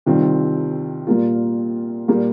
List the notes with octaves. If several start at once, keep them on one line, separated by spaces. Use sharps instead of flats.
C2 C3 D#3 C4 F4
A#2 G3 A#3 F4
A#2 G3 A#3